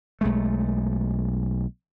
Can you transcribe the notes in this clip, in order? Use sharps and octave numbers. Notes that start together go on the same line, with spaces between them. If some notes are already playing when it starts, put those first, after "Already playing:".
B1 G#3 A3